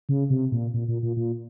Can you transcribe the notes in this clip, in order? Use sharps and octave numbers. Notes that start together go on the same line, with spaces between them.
C#3
C3
A#2
A#2
A#2
A#2
A#2